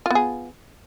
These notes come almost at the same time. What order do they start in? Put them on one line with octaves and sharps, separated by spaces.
F4 B3 G#4